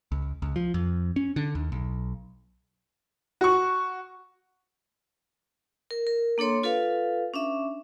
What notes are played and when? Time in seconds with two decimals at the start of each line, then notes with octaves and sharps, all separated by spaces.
0.12 C#2
0.42 C#2
0.56 F3
0.74 F2
1.16 C#4
1.36 D3
1.55 D#2
1.72 B1
3.41 F#4 C#6
5.91 A#4
6.07 A#4
6.38 A#3 D4 A4 C#5 C6
6.63 F4 A4 B4 F5
7.34 C#4 D4 E5